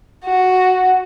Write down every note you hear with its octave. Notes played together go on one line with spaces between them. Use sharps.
F#4